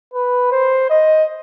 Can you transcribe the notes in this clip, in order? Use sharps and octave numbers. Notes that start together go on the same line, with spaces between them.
B4
C5
D#5